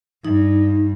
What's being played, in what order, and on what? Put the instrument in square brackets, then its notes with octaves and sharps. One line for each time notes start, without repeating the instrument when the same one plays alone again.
[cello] G2 [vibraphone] D#4